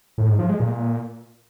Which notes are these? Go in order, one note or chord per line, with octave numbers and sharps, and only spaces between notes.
A2
G#2
F3
G#3
A#2